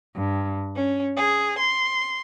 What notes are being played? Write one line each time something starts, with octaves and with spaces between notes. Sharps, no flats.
G2
C#4
G#4
C6